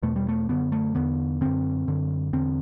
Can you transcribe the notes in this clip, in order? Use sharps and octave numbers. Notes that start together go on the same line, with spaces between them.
E2 B2 A3
G3
A3
F#2 D3 B3
A3
E2 D3 B3
F#2 D3 C4
F#2 D3
E2 D3 C4